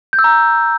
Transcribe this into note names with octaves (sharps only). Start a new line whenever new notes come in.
G6
E6
A#5